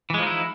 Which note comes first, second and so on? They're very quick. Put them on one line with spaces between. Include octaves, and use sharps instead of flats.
E3 G#3 F3 D#4 E4